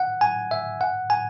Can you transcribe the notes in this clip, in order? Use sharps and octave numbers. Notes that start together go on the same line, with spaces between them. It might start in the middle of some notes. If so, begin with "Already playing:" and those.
Already playing: F#5
G#5
E5
F#5
G#5